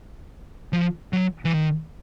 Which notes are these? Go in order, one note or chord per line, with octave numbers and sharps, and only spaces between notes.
F3
F#3
E3
D#3